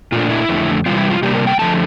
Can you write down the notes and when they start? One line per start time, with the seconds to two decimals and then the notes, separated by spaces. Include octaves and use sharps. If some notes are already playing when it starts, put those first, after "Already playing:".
0.12 A#2 A3 D4 F4
0.31 E4
0.49 F2 D3 A3
0.86 C3 E3 G3 C4 F4
0.98 E4
1.10 F4
1.22 C3 G3 A#3 D4 G4
1.35 A#4
1.47 G5
1.59 D3 F3 A3 A5